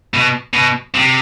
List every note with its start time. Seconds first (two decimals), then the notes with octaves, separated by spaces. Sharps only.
0.14 B2
0.53 B2
0.94 C3